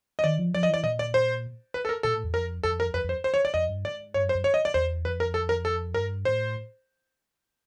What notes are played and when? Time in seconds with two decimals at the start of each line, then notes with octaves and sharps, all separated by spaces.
0.19 D#5
0.24 D#3 D5
0.38 F3
0.54 F3 D5
0.63 D#5
0.69 E3 D5
0.84 A#2 D#5
0.99 D5
1.14 C5
1.74 B4
1.85 A4
1.89 A#4
2.03 A#2 A4
2.14 A2
2.24 E2
2.34 F2 A#4
2.63 F2 A4
2.80 A#4
2.94 F2 B4
3.04 F2
3.09 C5
3.24 C5
3.34 C#5
3.45 D5
3.54 F2 D#5
3.69 G2
3.84 G#2 D5
4.14 G2 C#5
4.24 F#2
4.29 C5
4.35 F#2
4.44 C#5
4.54 D#5
4.65 D5
4.74 E2 C5
5.05 F2 B4
5.20 A#4
5.34 A4
5.49 A#4
5.65 A4
5.94 G2 A#4
6.25 A2 C5